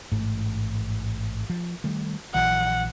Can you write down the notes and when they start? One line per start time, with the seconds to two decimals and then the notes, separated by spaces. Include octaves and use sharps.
0.12 A1 G#2 A3
1.50 F3
1.84 D#3 G3 A3
2.35 A#1 E3 F#3 F#5